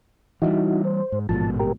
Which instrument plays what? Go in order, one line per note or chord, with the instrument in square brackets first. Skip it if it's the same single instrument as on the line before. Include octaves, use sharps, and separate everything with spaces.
[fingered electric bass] E3 F3 G3 [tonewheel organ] D#4 E4 F#4
[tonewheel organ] C5
[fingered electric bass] G#2
[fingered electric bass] A1 G#2 B2 [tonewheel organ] F3 A5
[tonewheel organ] G4 A#4